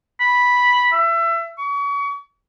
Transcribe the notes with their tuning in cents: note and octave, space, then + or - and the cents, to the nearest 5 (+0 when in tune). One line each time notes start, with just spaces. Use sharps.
B5 -5
E5 +30
C#6 +35